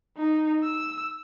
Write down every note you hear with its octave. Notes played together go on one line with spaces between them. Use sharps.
D#4
E6